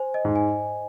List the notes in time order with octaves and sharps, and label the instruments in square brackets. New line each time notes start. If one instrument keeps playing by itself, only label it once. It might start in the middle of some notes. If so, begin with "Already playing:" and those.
Already playing: [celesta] C5 G#5
D#5
[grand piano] G#2
[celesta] G#5